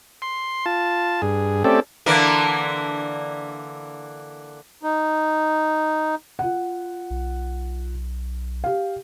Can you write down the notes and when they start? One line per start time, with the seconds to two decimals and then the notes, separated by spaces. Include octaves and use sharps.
0.22 C6
0.66 F4 A5
1.22 G2 G#4
1.64 A3 C4 C#4 G4 A4 D5
2.06 D3 E3 A#3
4.83 D#4
6.39 F4 F#5
7.10 B1
8.64 G4 F5